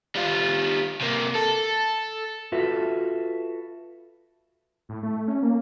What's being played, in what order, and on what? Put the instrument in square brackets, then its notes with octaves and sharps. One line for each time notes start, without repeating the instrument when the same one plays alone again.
[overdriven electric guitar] G3 F4
C3 A#3
A4
[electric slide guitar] F4 F#4 A4 B4 E5
[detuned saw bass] A2
A3
C#4
A#3